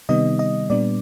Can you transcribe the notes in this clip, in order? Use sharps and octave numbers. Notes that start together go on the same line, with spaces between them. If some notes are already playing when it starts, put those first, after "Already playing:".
C3 D#3 G3 B3 D#4 D#5
D#5
A#2 G3 B3 D4 D5